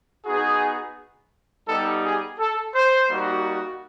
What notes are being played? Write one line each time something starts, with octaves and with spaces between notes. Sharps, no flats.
B3 D#4 F#4 G#4
G3 B3 D#4 G4 A4
G#4
A4
C5
G3 A#3 D#4 F#4